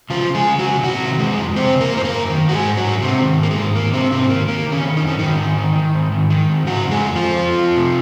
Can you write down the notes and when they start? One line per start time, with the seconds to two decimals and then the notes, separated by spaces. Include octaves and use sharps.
0.10 C#3 F3 F4
0.29 C#3
0.35 G#3 G#4
0.47 C#3
0.59 F#3 F#4
0.65 C#3
0.83 C3 F#3 F#4
1.02 D#3
1.20 C3 G#3 G#4
1.38 F2
1.56 C#3 C4 C5
1.75 C#3
1.80 A#3 A#4
1.93 F#2 C5
2.05 A#3 A#4
2.11 F#2
2.30 D#3
2.48 G#2 F#4
2.53 G#3 G#4
2.65 G#2
2.77 F#3 F#4
2.84 G#2
3.02 G#2 C3 C4
3.20 D#3
3.39 G#2 A#3
3.51 G#3
3.57 D#3
3.75 D#3 A#3
3.93 G#2 C3 C4
4.12 G#2 C3 C4
4.30 D#3 A#3
4.48 D#3 A#3
4.66 D#3
4.72 C#3 C#4
4.84 D#3
4.97 D#4
5.03 F#2 C#4
5.19 G#2 D#3 D#4
5.40 D#3
5.58 D#3
5.76 D#3
5.94 G#2
6.12 D#3
6.30 D#3
6.49 G#2
6.67 C#3 F#3 F#4
6.86 F2
6.91 G#3 G#4
7.04 F2
7.15 F3 F4
7.22 F2
7.40 F2
7.58 F2
7.76 C3